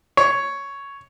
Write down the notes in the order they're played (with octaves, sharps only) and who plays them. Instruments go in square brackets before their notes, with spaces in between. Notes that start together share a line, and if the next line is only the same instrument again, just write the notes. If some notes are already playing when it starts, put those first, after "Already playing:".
[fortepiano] C#5